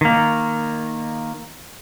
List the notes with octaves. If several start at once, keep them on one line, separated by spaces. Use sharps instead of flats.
D#3 A#3